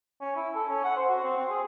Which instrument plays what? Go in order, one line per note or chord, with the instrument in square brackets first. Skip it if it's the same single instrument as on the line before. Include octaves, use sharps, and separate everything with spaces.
[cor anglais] C#4
E4
A4
C#4
F#5
C5
F#4
C4
C4
G#4